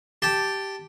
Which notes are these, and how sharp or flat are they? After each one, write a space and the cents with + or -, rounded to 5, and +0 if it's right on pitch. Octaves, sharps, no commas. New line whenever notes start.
G4 -5 A5 +0